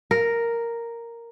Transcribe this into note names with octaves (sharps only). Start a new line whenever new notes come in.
A#4